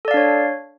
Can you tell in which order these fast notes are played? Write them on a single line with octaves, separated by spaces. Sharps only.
A4 D5 F5 D4 C#5